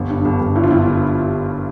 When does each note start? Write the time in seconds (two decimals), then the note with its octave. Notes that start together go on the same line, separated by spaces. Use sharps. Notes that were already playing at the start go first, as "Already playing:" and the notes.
Already playing: G1
0.09 G2
0.25 G1
0.40 G1
0.55 G2 E4
0.64 F4
0.71 G1 E4